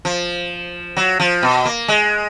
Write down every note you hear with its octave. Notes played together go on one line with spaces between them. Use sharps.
F3
F#3
F3
B2
A#3
G#3